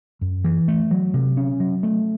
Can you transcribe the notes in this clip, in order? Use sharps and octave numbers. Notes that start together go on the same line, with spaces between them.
F#2
E3
A3
F#3
C3
C#4
F#3
A3